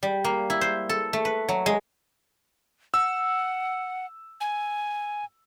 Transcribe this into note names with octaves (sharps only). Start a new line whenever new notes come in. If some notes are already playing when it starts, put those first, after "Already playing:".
G3
A#3
E4
C5
A4
A3
B4
F#3
G#3
F#5 E6
G#5